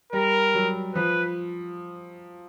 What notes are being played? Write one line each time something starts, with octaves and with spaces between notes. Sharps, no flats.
G3 A#4
F#3
F3 B4